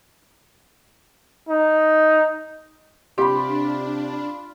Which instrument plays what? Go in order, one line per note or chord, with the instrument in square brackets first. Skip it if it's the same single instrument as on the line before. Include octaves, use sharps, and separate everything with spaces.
[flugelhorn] D#4
[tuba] C3 [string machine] D4 [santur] F4 B5 [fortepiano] G4